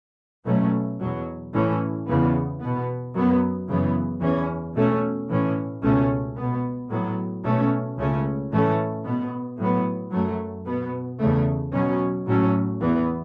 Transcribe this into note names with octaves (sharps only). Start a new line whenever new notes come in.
B2 F#3 A3 C#4
E2 B2 F#3
A2 E3 A3 C#4
E2 C#3 E3 B3
B2 B3
F#2 F#3 B3
F#2 C#3 E3 B3
E2 E3 C#4
B2 A3 C#4
A2 E3 C#4
C#2 B2 A3 C#4
B2 B3
A2 F#3 B3
B2 A3 C#4
C#2 C#3 A3 C#4
A2 E3 A3 C#4
B2 B3
A2 F#3 B3
F#2 F#3 A3
B2 B3
E2 C#3 A3
B2 F#3 C#4
A2 F#3 A3 C#4
E2 E3 B3